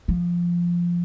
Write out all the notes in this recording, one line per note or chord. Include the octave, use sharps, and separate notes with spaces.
F3